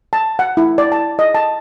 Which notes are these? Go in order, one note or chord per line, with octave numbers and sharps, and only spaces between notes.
A5
F#5
E4
D5
A5
D#5
A5